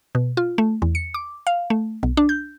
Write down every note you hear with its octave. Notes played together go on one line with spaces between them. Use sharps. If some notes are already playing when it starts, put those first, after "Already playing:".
B2
F4
A3
E2
C#7
D6
F5
A3
B1
D4
G6